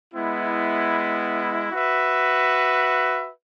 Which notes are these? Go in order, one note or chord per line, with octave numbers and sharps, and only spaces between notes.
G#3 B3 E4
F#4 B4 E5